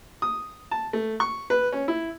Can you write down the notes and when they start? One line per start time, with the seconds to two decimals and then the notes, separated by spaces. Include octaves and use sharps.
0.22 D#6
0.71 A5
0.93 A3
1.20 C#6
1.50 B4
1.73 C#4
1.88 E4